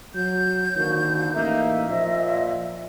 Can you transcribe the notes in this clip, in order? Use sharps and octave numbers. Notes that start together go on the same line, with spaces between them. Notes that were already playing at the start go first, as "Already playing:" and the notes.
F#3 G6
D3 D#3 F3 A#3 F#4
A1 A#3 D#4 E5
A#2 F3 D#5